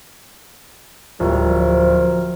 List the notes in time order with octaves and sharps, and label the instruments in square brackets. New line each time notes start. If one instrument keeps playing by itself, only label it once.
[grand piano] D1 [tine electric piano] F3 [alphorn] G3 [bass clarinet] A#4
[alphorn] C5